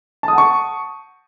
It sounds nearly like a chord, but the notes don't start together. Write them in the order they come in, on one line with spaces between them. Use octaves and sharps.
A5 D#6 F#5 C#6